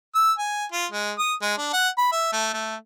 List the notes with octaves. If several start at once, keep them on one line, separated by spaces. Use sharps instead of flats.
E6
G#5
F4
G#3
D#6
G#3
D4
F#5
B5
E5
A3
A3